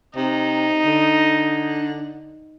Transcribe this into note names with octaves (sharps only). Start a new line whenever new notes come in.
C3 D#4
D3